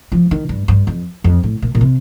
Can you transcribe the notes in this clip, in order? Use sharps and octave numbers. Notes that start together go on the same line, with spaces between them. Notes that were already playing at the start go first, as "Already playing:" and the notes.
F3
D#3
G2
G2
F2
F2
A2
A#2
A#2
C3